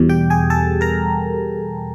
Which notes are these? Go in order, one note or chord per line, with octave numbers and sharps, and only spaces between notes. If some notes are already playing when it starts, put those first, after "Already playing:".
Already playing: E2 B2 G3
G4 G5
G#4 G#5
A4 A5
A#4 A#5